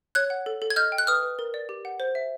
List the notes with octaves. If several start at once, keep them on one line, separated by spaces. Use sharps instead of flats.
C#5 F#6 G#6
F#5
A4
A4
G#6
D#5 F6 G6
G5
F#6
B4 D#6 F6
B4
A#4
D5
G4
F#5
C5
E5